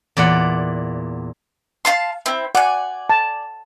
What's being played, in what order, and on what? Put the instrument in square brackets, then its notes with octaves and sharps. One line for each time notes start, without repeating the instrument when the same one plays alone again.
[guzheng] E2 A#2 D5 F#5
[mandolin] F5 A5 C6
C4 E4
[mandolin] D5 G#5 [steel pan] F#5
[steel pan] A5